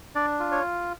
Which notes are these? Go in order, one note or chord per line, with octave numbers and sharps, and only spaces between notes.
D4 D5
F4
C#5